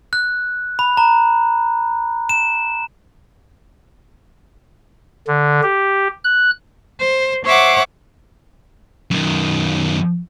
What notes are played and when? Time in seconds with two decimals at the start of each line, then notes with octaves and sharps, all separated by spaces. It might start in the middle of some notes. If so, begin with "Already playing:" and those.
0.13 F#6
0.79 B5
0.97 A#5
2.29 E7
5.27 D3
5.63 G4
6.24 F#6
7.00 C5
7.45 C5 C#5 E5 F#5 D6
9.11 F#2 D#3